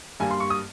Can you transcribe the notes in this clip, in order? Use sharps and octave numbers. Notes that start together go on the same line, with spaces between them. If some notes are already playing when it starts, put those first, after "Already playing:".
G2 G3 A#3 G#5
C6
C#6
D#6